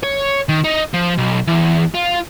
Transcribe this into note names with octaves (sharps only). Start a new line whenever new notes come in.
C#5
D#3
D#4
F3
B1
E2
F4